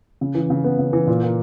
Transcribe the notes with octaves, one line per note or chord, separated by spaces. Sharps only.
C#3
E3
C#3
B3
C#3
E3
A#2
A#3